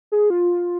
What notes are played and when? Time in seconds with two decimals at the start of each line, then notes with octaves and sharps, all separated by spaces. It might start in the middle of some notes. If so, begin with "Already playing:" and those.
0.12 G#4
0.30 F4